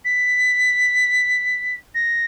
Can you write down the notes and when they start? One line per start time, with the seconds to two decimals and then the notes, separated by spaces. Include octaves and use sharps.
0.05 B6
1.94 A#6